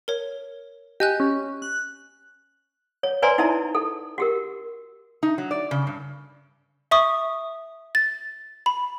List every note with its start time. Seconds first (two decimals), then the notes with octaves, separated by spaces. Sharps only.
0.08 A#4 C#5
1.00 G4 D#5 G#5 F#6
1.20 C#4
1.62 F#6
3.03 C#5
3.22 B4 C5 D5 G#5 A#5 C6
3.38 D#4 E4 E5 A5 A#5
3.75 A4
4.18 F#4 G4 A#4
5.23 D#4
5.38 F#3
5.51 D5
5.71 C#3
5.87 G2
6.91 E5 C#6 D#6
7.95 A6
8.66 B5